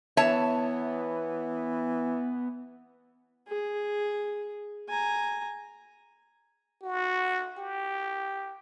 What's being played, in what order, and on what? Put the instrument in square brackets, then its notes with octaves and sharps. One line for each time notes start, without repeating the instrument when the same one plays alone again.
[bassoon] E3 [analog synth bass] B3 [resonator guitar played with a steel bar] C#5 E5 A5
[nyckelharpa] G#4
G#5 A#5
[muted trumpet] F#4
G4